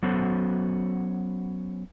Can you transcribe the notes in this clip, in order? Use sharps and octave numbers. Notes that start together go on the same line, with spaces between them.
F#3 B3 C#4 F#4 A4 C5